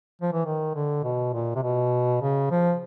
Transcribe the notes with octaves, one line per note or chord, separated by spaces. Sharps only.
F3
E3
D#3
D3
B2
A#2
C3
B2
C#3
F3